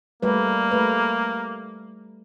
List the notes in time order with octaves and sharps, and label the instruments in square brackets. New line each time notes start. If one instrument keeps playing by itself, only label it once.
[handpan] G3 A3 B4 [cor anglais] A#3
[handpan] A3 B4